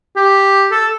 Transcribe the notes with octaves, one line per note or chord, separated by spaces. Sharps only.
G4
A4